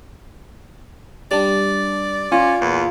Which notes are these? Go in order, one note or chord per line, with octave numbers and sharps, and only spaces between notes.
G3 D4 D5
C#4 F4
E2 A#2